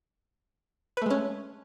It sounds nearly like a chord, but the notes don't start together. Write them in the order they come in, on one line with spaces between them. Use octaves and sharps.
B4 A3 G#3 C#4